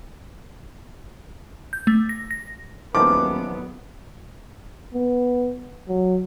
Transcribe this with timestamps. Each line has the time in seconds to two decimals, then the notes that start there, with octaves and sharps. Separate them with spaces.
1.73 G6
1.87 A3
2.09 A#6
2.31 A#6
2.95 D#1 E2 D#3 F3 F#3 B3 D6
4.94 B3
5.88 F#3